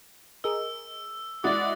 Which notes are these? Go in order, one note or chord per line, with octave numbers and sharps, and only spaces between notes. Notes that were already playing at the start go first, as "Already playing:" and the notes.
G#4 A#4 D#5 E6
G#3 E4 F#4 D5 D#6 A6